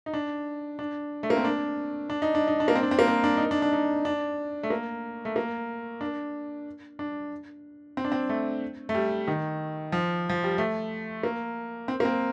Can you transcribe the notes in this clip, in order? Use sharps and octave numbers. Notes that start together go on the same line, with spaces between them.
D#4
D4
D4
A3
A#3
C4
D4
D4
D#4
D4
D#4
D4
A#3
C4
D4
C4
A#3
C4
D4
D#4
D4
D4
D#4
D4
A3
A#3
A3
A#3
D4
D4
C4
D4
C4
A3
A3
G3
D#3
F3
F3
G3
A3
A#3
C4
A#3
C4